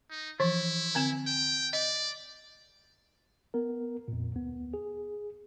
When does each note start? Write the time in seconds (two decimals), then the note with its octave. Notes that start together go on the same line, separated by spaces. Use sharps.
0.10 D#4
0.40 E3 F3 E4
0.95 D3 C4 G#5
1.27 G5
1.73 D5 D#5
3.54 B3 A#4
4.08 F2 A#2
4.32 D2 B3
4.74 G#4